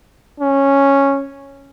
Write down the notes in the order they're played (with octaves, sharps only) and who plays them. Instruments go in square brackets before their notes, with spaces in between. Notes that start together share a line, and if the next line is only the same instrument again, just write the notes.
[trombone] C#4